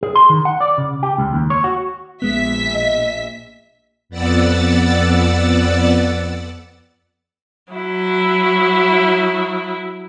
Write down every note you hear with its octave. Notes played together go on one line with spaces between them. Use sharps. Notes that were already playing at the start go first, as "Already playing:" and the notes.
G#4
C6
D#3
F#5
D5
C#3
G4
C#2
D#2
C#5
F#4
A#1 G#3 B3 E5 B6
D#5
F2 B3 D5 F#5 E6 A6
F#3 E4